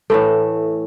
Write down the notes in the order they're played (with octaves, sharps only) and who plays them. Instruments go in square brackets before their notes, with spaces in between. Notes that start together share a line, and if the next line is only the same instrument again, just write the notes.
[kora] A2 E3 A3 [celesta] A4